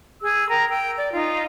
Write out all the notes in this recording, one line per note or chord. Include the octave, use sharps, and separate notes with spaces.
G#4 E6
A#4 G5 A#5
G5 E6
D5
D#4 F4